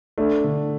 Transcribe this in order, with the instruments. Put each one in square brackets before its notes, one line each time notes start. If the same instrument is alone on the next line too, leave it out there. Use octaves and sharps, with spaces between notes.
[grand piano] A3 [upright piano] D4
[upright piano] D3